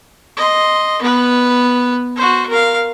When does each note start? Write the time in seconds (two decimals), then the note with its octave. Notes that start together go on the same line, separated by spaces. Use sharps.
0.37 D#5 C6
1.02 B3 B4
2.16 F#4 C5
2.49 A#4 F5